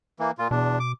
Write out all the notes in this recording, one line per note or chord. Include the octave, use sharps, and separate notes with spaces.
E3 A#3
A#2 F4
E2 B2 D4
D6